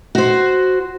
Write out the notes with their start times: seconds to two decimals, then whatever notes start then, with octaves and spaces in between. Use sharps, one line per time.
0.15 F#4 C5